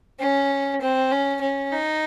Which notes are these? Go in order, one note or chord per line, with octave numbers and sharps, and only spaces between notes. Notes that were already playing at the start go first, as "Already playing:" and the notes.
C#4
C4
C#4
C#4
D#4